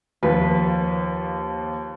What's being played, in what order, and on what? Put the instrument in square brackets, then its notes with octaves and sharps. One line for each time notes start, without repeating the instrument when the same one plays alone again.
[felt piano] D#2 F3 [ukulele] B4